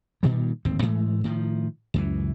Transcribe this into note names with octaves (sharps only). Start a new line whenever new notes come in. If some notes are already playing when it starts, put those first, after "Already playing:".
G2 A#2 D#3 G3
D1 G#1 D#2 C4
G#2 E3 G#3 A3
A2 D#3 F3
C#2 F#2 E3